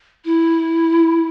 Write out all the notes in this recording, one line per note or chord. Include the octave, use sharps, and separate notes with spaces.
E4